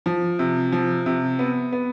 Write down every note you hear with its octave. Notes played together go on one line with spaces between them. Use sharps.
F3
C3
F3
C3
B3
B3